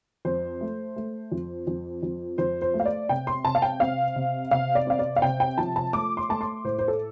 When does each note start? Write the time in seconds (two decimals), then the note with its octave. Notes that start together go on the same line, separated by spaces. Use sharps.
0.25 F2 C5
0.61 A3
0.96 A3
1.32 F2
1.67 F2
2.03 F2
2.38 F2 C5
2.62 C5
2.74 A3
2.80 F5
2.86 D5
3.09 C3 G5
3.27 C6
3.45 C3 A5
3.55 F5
3.62 G5
3.80 C4 F5
4.16 C3
4.51 C3 F5
4.75 D5
4.87 C4 F5
4.99 D5
5.16 F5
5.22 C3 G5
5.40 G5
5.58 F3 A5
5.76 A5
5.93 A3 D6
6.17 C6
6.29 A3 A5
6.41 C6
6.64 A2 C5
6.79 C5
6.88 A4